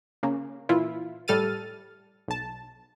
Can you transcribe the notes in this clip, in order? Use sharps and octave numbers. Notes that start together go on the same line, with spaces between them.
C#3 A#3
A#2 E3 E4 F4
A2 G3 A4 F6 A6 D#7
B1 A5